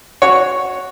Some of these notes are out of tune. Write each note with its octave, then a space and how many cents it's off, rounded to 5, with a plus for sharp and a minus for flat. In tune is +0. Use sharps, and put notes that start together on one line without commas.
F#4 -5 C#5 +0